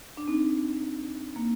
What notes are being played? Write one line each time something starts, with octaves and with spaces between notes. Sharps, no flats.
D4
C4 D#4
A#3